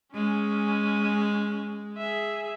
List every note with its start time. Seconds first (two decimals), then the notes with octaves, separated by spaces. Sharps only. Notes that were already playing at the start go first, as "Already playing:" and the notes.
0.14 G#3 C#4
1.98 G#4 E5